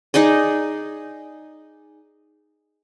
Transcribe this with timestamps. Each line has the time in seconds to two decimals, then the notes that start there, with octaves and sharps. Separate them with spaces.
0.14 D#4 G#4 D5 D#5